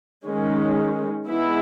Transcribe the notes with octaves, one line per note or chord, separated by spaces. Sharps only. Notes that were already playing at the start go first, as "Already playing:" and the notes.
D#3 G#3 C#4
E3 G#3 B3 E4